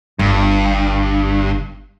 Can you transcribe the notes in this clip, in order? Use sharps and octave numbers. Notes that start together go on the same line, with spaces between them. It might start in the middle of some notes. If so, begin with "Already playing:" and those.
G1 G2